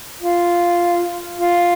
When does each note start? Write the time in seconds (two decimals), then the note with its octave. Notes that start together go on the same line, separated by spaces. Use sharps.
0.21 F4
1.38 F4